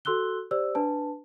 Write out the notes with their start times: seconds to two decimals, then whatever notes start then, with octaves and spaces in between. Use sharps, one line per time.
0.05 F#4 A4 C6 E6 F#6 G7
0.51 G4 C5 D5 E6
0.75 D4 B4 A5